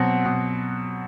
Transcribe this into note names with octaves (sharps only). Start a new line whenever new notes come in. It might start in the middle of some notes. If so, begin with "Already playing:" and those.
Already playing: B2 F#3 C4 F#5
B2